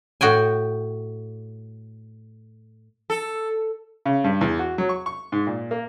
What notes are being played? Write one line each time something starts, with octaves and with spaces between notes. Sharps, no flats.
A2 F#4 G5 G#5
A4
C#3
G2
E2
F#4
F#3
C#6
C#6
G#2
A#2
A#3